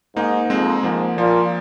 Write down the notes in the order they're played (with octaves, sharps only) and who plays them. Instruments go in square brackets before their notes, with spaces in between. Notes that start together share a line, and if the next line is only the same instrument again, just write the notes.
[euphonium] G#2 [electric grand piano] A#3 D#4
[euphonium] F2 [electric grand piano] G#3 C4
[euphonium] G#2 [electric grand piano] F3 A#3
[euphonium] A#2 [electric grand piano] F3 A#3